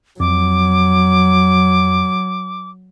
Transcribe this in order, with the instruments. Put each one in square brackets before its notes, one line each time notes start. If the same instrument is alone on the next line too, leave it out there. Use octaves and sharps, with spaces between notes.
[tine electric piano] F2 [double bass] F#3 [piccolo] D6